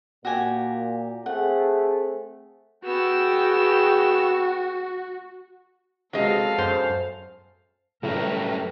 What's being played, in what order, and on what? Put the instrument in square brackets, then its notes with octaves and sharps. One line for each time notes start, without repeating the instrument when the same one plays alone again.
[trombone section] A#2 [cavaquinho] F#4 G4 G#5
[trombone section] A3 C4 G#4 [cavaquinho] F#5
[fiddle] B3 E6 [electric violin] F#4 [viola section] G#4 G5
[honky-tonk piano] C3 G#3 B3 [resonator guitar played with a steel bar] F#3 D#5 [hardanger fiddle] A4 F5
[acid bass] F#2 [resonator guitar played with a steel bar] C5
[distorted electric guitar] F#2 G3 [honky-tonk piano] A2 [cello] A#4 B4